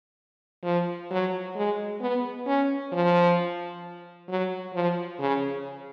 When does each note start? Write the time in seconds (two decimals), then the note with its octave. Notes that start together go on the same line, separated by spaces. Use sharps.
0.64 F3
1.10 F#3
1.55 G#3
2.01 B3
2.47 C#4
2.92 F3
4.29 F#3
4.74 F3
5.19 C#3